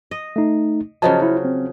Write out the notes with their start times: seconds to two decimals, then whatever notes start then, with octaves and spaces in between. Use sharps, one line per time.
0.11 D#5
0.36 A3 D#4
1.02 C#3 F3 F#3 D#5 A5
1.22 E4
1.45 C4